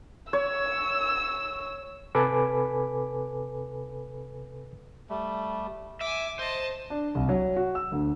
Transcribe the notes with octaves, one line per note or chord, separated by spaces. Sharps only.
C#5 E6
C3 A4 B4 G#5 B5 D6
G3 A3
E5 G#5 D6
C5 D#5 A5
D4
C2
F#3
F#4
E6
D2